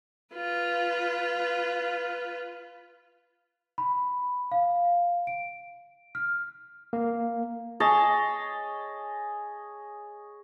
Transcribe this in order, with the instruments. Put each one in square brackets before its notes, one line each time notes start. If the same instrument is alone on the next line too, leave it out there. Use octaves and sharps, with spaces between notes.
[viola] F4 B4
[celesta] B5
F5
D7
F6
[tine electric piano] A#3
[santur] G#4 C#5 D#5 A5